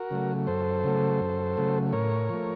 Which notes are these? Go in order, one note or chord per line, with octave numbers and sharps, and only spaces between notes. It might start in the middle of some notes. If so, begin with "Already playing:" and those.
Already playing: F#4 A#4
C#3 F#3 A3
F#2 A4 C5
C#3 F#3 A3
F#2
C#3 F#3 A3
A2 A#4 C#5
F3 A3